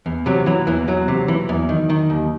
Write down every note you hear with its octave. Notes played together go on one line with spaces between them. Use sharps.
E2
C3 F#3
E3 F#3
E2 E3
E2 F#3
C3
E3
E2
D#3
D#3
D#2